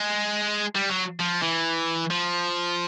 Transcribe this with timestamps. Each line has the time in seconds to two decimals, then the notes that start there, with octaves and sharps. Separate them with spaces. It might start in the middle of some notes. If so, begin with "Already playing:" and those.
Already playing: G#3
0.75 G3
0.89 F#3
1.20 F3
1.42 E3
2.10 F3